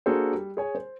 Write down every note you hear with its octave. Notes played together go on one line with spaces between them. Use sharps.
A#3 D4 F#4 G#4 A4 C5
G3
G#4 C#5 G#5
C5